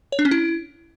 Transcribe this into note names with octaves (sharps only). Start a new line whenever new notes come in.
C#5
D4
C#4
E4